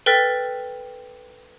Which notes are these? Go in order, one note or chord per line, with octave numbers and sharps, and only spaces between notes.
A4 B4 G5 F6 A6 B6